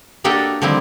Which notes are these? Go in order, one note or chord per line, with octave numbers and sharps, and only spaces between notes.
A#3 D4 F#4 G4 A4 D#5
D3 D#3 F3 G3 C4 E4